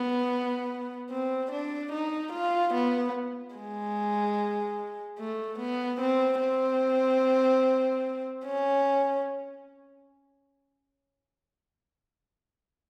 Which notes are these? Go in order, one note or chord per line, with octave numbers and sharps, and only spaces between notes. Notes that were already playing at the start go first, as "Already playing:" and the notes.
Already playing: B3
C4
D4
D#4
F4
B3
G#3
A3
B3
C4
C4
C#4